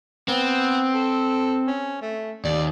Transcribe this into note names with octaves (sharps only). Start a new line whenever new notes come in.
B3 C4
A4
C#4
A3
D#2 D5